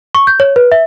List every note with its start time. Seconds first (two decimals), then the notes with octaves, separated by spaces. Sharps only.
0.15 C#6
0.27 G6
0.40 C#5
0.56 B4
0.72 E5